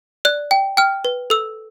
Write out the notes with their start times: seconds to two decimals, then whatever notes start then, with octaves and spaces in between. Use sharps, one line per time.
0.25 D5 F#6
0.51 G5
0.77 G5 F6
1.05 B4
1.30 A4 E6